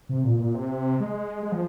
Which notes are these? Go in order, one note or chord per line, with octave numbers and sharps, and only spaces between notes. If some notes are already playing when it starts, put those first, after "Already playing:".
C3
A#2
A#2
C3
G#3
G#3
F3